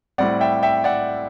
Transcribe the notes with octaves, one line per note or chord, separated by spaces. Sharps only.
A2 G3 C4 D5 F#5
E5 G5
E5 G5
D5 F#5